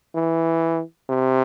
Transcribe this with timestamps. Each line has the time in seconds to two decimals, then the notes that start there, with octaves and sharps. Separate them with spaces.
0.15 E3
1.10 C3